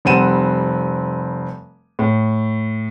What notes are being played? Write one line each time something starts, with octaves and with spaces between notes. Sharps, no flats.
F1 G3 C4 F#5 D#7 E7
A2